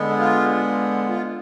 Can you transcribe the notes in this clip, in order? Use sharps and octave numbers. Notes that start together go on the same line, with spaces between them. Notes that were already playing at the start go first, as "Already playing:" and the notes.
Already playing: D3 G#3 B3
F4
F4